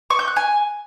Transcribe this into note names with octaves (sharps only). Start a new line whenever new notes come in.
C#6
G6
F#6
G#5